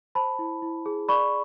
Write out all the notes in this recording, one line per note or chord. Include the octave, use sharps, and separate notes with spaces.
C5 A5 B5
E4
E4
G#4
D5 B5 C#6